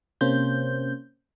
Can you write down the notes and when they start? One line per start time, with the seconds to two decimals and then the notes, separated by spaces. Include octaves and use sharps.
0.21 C3 A#3 C#4 C5 G6